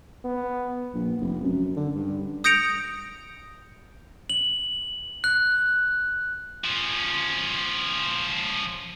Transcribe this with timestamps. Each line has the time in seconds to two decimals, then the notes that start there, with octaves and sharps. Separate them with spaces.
0.24 B3
0.94 A#1
1.21 F1
1.43 F#2
1.77 D3
1.95 G2
2.44 D#6 G6 A#6 C#7 D7 F7
4.30 F#7
5.24 F#6
6.64 F3 C#4